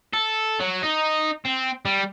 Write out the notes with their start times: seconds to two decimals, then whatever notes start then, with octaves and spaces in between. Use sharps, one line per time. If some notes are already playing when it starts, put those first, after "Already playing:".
0.13 A4
0.60 F#3
0.83 D#4
1.46 C4
1.85 G3